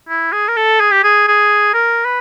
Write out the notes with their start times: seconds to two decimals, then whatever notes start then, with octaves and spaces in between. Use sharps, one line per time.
0.09 E4
0.32 G#4
0.48 A#4
0.56 A4
0.80 G#4
0.91 G4
1.04 G#4
1.28 G#4
1.74 A#4
2.05 B4